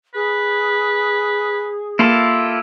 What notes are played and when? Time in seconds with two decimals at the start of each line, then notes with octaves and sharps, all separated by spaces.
0.14 G#4 B4
1.99 A#3 E4 F4 G4 A4